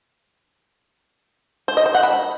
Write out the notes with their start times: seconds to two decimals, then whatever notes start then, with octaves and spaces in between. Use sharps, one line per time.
1.68 C5
1.77 D#5
1.86 C5
1.95 F#5
2.03 B5